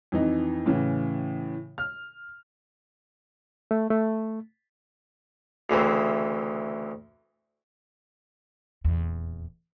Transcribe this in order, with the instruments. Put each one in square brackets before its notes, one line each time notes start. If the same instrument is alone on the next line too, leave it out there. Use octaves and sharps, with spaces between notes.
[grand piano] F2 E3 D#4
A2 C#3 E3
F6
[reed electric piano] A3
A3
[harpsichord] D2 C#3 E3 C4
[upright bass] D#1 E2